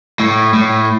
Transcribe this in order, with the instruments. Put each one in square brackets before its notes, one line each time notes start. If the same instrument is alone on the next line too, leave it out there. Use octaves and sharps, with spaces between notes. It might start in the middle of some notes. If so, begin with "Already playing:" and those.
[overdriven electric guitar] A2
A2